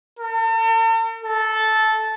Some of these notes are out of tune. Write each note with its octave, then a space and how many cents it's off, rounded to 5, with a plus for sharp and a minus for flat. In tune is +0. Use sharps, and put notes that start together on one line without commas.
A4 +45
A4 -10